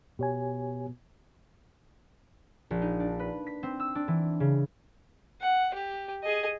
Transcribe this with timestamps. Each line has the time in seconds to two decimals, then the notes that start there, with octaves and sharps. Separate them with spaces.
0.19 B2 G4 C#5 G#5
2.71 A#1
2.82 D#4
3.00 D4
3.19 B4
3.47 B6
3.63 C4
3.80 E6
3.95 D4
4.08 E3
4.40 C#3
5.41 F#5
5.74 G4
6.23 G#4 D#5